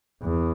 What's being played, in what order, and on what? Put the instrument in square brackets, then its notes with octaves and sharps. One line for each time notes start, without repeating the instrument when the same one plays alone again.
[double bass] E2